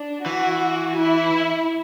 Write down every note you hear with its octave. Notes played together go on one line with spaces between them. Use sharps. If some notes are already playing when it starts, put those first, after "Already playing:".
Already playing: D4
E3 F#4
E4